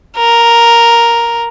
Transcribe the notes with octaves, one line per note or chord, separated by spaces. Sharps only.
A#4